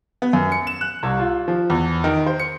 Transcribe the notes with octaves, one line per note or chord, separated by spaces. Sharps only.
B3
F#2
C#7
E7
F#6
C2
F4
F3
E2
D#3
C5
C#7